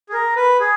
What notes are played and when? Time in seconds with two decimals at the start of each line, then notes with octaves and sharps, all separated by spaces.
0.09 G#4
0.13 A#4
0.36 B4
0.60 G#4